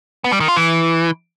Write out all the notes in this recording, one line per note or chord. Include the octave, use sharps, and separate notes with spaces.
B3
G3
D#3
F4
E3